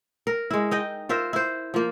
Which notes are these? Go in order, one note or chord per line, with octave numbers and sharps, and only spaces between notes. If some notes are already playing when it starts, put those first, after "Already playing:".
A#4
G#3 E4
D#4 D#5 G5
F4 A#4 C5 E5
E4 C5
F3 A#3